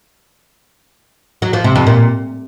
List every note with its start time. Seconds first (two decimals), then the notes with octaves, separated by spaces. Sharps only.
1.42 F#3
1.53 F3
1.64 C3
1.75 F2
1.87 A#2